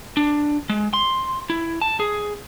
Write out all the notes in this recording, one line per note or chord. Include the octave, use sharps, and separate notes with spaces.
D4
G#3
C6
E4
A5
G#4